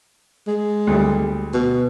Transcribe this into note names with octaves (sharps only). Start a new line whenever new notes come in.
G#3
D2 G3
B2